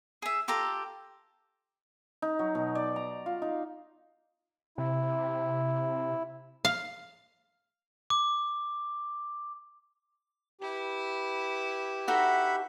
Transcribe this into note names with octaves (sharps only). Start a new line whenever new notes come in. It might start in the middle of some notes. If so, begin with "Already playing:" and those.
G#4 E5
F4 G4 A4 A#5
D#4
F#3
B2
D5
A#5
F4
D#4
C3 E4
F5
D6
E4 G4 B4
D#4 F#4 A4 E5 F#5 B5